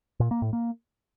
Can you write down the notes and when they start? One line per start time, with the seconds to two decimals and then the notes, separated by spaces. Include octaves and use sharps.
0.20 A#2
0.31 A#3
0.42 A2
0.53 A#3